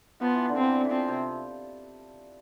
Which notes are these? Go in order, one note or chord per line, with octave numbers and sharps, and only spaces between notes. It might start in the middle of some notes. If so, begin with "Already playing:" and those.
F3 B3
E3
D3
C4
E3
E3
F3 C4
C3